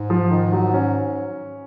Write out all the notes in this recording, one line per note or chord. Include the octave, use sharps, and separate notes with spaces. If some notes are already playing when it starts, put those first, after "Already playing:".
Already playing: G#2
F3
D#3
F#3
C#4